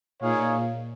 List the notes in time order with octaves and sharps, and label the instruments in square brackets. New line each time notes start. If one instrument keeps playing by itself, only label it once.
[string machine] A#2 [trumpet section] D#4 G#4 C#5 F5